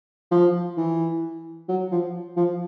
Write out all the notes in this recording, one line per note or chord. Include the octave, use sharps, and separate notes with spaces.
F3
E3
F#3
F3
F3